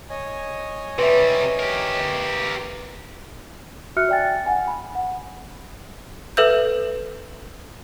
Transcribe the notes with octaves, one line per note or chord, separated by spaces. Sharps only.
C#5 D#5 G#5
C3 G3 B4 E5
G4 A#4
F#4 E5 F6 F#6 C#7
D5 E5 G5 G#5 A6
F#5 G#5
B5
F#5
A4 B4 E5 E6 G6